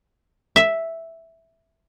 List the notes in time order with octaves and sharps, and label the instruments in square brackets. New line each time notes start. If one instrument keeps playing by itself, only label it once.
[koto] E5